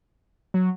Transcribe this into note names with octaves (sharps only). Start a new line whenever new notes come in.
F#3